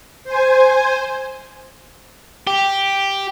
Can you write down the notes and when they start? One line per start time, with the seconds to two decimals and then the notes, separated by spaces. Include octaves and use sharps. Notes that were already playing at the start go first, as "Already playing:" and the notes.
0.24 C5 G#5
2.47 G4